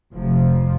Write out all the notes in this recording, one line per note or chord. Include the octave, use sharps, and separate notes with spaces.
F1 F2 C3 F3